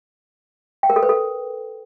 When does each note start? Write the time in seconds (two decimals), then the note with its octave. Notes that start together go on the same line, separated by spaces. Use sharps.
0.83 G5
0.90 A#4
0.96 A4
1.03 B4
1.09 A4